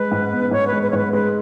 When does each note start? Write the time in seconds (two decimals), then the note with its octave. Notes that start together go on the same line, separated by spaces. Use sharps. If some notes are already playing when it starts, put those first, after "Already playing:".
Already playing: G#3 B4
0.11 G#2
0.32 B3
0.51 G#2 C#5
0.67 B4
0.72 G#3
0.83 B4
0.90 C#5
0.93 G#2 B4
1.13 G#3 B4